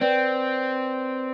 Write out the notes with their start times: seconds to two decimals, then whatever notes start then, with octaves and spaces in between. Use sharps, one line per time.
0.01 C4 B4 D5 G5